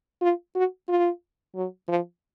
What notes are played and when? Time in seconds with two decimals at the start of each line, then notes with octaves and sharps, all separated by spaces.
0.22 F4
0.55 F#4
0.89 F4
1.55 F#3
1.88 F3